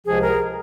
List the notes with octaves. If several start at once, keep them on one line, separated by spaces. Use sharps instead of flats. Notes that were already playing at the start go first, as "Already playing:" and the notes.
C#2 C3 F3 G#4
A#4